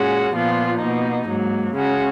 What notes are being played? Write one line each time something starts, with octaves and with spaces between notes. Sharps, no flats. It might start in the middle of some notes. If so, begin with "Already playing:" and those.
Already playing: A#2 G#3 C#4 F#4
A#2 F3 B3 F4
B2 A#3 D#4
G#2 F#3 A#3
C#3 G#3 C#4 F#4